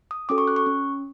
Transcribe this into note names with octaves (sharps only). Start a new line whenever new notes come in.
D#6
C#4 F#4 A4 D6
C#6
F#6
C#6
C#4